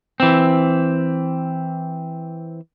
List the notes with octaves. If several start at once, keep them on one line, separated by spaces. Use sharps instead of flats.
E3 C4